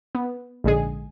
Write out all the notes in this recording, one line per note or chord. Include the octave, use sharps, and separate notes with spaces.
B3
A#1 G#2 D3 G#3 G#4